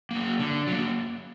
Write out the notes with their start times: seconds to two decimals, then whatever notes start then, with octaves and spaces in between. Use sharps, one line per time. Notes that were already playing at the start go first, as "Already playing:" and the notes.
0.11 F#3 A#3
0.39 D3
0.67 F#3 A#3